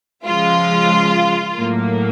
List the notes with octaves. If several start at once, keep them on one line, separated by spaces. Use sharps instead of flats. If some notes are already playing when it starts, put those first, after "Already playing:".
C#3 F3 G#3 F4
A2 F#3 A#3